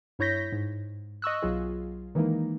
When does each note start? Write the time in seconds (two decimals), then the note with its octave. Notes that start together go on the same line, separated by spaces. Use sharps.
0.19 G2 E4 C#5 G6 A#6 B6
0.52 G#2
1.22 D#5 C#6 E6 F#6
1.42 B1 F#3 F4 G#4
2.15 D#3 E3 G#3 A#3 D#4